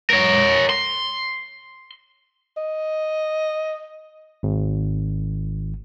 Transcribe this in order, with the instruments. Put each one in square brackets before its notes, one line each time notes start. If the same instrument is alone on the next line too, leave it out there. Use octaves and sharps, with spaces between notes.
[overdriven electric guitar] A#4 C#5
C6
[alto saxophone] D#5
[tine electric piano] G#1